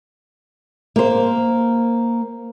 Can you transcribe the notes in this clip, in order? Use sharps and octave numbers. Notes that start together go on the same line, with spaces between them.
A#3 C5